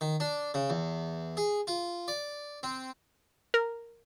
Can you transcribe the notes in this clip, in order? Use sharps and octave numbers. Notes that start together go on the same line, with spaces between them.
D#3
D4
C#3
E2
G#4
F4
D5
C4
A#4